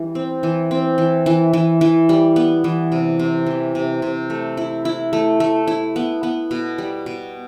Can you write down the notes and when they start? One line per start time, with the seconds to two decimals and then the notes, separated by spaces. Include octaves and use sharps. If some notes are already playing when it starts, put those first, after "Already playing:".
Already playing: E3 G3
0.15 C4
0.43 E3
0.71 C4
0.98 E3
1.26 E3
1.53 E3
1.81 E3
2.09 G3
2.36 B3
2.64 E3
2.92 C3
3.19 C3
3.46 E3
3.75 C3
4.02 C3
4.30 A3
4.57 E4
4.85 E4
5.13 A3
5.40 A3
5.67 E4
5.96 B3
6.23 B3
6.51 B2
6.78 G3
7.06 B2